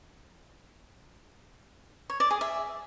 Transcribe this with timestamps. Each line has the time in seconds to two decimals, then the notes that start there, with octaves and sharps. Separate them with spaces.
2.10 C#5
2.20 D5
2.31 G#4
2.41 E5